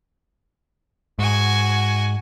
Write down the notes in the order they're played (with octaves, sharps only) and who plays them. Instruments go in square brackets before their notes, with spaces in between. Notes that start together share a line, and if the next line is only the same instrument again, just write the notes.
[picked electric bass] G#2 [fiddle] F#4 G#5